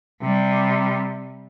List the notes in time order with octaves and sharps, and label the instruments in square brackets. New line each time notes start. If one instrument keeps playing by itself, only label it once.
[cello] C3 G3